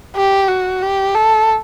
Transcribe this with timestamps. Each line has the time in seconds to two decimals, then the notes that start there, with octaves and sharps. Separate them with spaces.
0.15 G4
0.48 F#4
0.82 G4
1.15 A4